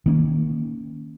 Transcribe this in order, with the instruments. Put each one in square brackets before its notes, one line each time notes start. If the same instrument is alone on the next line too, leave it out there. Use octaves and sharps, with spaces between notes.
[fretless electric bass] D#3 A#3 C#4